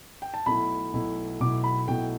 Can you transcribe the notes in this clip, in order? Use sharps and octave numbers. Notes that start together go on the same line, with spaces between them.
G5
A5
B1 B2 A3 E4 B5
B1 B2 A3 E4
B1 B2 A3 E4 D6
B5
B1 B2 A3 E4 G5